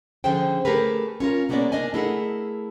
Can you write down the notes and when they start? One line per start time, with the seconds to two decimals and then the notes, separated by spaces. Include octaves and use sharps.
0.24 D3 F3 C#4 G#4 C5 G5
0.65 A3 G4 G#4 A#4 B4
1.20 C#4 F4 A#4
1.49 C3 G#3 A#3 B3 C#4 D5
1.72 D4 A#4 D#5 G#5
1.94 A3 E4 G#4 A#4 D#5 F#5